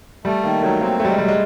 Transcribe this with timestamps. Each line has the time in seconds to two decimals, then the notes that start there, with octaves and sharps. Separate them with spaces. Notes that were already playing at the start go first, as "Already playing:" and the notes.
0.25 G3 A3
0.43 D#3 A#3
0.63 F#3 A3
0.81 A#3 C4
1.00 F#3 G3 A3
1.10 G#3
1.18 F#3 G3
1.28 G#3